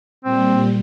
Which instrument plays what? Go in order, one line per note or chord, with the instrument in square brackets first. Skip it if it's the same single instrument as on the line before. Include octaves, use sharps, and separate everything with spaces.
[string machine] A#2 G3 [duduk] C4